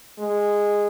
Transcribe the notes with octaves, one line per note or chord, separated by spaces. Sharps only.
G#3